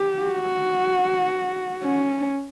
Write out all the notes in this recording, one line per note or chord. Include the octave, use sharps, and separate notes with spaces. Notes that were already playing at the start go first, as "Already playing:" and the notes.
Already playing: G4
F#4
C#4